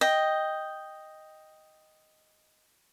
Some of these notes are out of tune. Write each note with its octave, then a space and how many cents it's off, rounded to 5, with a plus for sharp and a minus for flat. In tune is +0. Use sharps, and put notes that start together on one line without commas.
D#5 +0 G5 +0